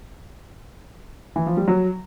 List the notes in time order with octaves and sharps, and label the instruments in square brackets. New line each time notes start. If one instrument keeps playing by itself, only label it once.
[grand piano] E3
F3
G3
F#3